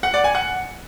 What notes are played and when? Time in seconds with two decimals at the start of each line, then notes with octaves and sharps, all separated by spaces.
0.03 F#5
0.14 D5
0.24 G#5
0.35 F#5